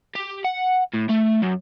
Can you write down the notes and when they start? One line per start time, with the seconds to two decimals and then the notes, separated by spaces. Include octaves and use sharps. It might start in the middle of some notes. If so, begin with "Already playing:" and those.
0.15 G4
0.44 F#5
0.94 A2
1.10 A3
1.43 F#2